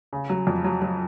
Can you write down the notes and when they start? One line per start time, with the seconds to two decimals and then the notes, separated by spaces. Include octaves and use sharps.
0.13 C#3
0.29 F#3
0.47 F2
0.64 F#3
0.82 F#3